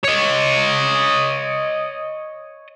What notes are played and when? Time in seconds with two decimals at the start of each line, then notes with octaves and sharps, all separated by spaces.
0.04 C#5 D#5